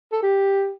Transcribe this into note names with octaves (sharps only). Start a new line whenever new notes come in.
A4
G4